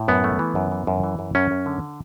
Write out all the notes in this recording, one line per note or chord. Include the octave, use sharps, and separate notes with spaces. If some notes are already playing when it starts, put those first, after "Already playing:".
Already playing: A2
F#2 B3
A3
E3
F#2
E3
F#2
E3
F#2
F#2 C#4
F#2
D3